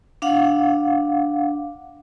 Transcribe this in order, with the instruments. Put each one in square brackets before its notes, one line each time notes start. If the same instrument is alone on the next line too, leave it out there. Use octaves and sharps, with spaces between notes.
[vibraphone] D4 F5 F#5